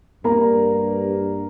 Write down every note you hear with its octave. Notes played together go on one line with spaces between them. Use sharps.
G2 A#3 A#4 A#5